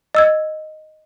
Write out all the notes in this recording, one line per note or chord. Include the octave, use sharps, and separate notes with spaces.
D#5 E6 G#6